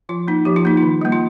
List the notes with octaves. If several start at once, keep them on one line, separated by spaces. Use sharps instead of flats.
F3 F4
A#3 D#4
F3 G4
F4
A#3 D#4
F4
D#3
G3 A#3
F4